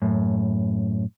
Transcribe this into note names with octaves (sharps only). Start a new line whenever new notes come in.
F#2 A2